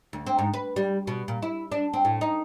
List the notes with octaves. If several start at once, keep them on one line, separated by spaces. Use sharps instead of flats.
D2
C4
G#2
B4
G3
B2
A#2
E4
D4
C4
A2
D#4